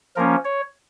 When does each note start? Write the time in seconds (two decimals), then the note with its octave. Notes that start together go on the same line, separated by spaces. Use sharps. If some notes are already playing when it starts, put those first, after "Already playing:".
0.16 F3 A#3 C#4 A#4
0.45 C#5